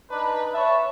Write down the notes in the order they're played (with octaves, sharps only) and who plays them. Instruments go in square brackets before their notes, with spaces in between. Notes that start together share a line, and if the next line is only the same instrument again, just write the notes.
[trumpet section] D4 D#4 B4
B4 C#5 E5 A5